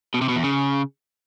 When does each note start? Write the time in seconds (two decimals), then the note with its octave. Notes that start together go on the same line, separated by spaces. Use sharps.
0.14 B2
0.21 C3
0.29 B2
0.36 E2
0.44 C#3